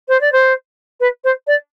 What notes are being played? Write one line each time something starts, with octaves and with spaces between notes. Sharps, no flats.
C5
D5
C5
B4
C5
D5